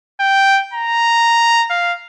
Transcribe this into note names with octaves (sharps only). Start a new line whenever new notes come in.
G5
A#5
F5